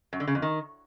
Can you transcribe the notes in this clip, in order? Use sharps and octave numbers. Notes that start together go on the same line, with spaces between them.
F#2
D3
C#3
F2
D#3